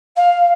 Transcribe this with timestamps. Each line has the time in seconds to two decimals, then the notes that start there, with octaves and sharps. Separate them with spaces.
0.16 F5